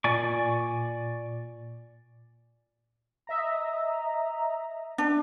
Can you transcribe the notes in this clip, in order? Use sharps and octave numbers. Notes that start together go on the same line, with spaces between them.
A#2 D5 G#5 C#6
D#5 E5 A#5
D4